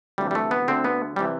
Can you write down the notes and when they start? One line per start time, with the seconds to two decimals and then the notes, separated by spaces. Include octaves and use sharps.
0.18 D2 C3 E3 G3
0.31 G3
0.35 A3
0.51 B3
0.68 D2 D3 C4
0.84 B3
1.16 C3 E3 G3